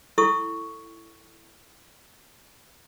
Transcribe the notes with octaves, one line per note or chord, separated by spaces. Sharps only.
E4 A4 C#6 D#6